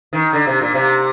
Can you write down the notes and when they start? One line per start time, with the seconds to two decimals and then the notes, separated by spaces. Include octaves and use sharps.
0.13 D#3
0.33 D3
0.47 C3
0.61 A#2
0.74 C3